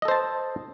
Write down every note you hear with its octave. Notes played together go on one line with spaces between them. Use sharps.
A4 C5 D#5 A5